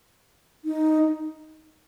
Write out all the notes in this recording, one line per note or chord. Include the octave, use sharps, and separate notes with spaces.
D#4